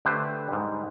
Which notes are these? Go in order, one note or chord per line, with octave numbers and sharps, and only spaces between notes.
D3 A3 G4 B4 C5
G#2 G3